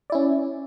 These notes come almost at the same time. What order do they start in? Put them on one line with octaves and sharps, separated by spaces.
D5 E4 C#4